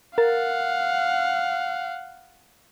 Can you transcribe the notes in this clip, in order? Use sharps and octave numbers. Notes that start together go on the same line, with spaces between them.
A#4 F5 F#5 A6